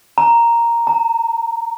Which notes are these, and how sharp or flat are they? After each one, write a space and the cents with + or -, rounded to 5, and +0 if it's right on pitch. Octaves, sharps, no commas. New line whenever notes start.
A#5 +0
A#5 -40